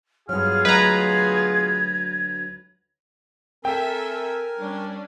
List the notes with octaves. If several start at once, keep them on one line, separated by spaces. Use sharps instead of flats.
G2 F#3 B3 F4 G#4 F6
D2 F#3 B4 D#5 A#5 G#6
C4 A4 A#4 E5 G5 G#5
G3 C#4 D4